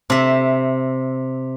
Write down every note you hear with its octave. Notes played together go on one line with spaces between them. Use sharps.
C3 E5